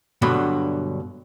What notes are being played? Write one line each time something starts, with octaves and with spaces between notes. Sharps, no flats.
G2 B2 D3 F#3